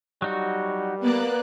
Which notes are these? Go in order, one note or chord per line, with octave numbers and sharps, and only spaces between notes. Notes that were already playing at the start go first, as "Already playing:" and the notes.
F#3 G3 D#4 F#4
A#3 B3 D5 F#6